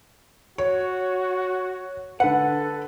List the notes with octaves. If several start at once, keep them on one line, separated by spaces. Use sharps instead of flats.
F#4 C#5
D3 A4 B4 F#5